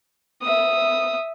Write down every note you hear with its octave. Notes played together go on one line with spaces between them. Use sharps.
E5 D#6